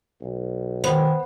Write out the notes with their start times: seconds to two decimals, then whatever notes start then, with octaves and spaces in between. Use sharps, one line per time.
0.22 B1
0.84 D#3 B3 C5